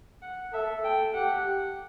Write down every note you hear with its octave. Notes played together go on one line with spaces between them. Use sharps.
F#5
A4 E5
G5
G4 F#5